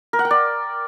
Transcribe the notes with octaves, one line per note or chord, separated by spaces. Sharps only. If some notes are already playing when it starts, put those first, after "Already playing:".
A#4
F#5
G5
D5